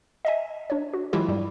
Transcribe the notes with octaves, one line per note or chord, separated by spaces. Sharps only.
D#5 E5 G#5
D4 C#5
F#4
E3 F#3 G#3 E4 F4 G4
G2 G3